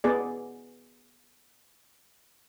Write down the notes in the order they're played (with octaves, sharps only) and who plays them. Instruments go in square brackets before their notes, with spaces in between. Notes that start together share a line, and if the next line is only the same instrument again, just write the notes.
[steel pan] B3 G#4 D5